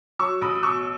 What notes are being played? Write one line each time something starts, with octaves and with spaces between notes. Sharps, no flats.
F#3 C#6 E6
A1 B5 D#6
D#6
B2 C#6 E6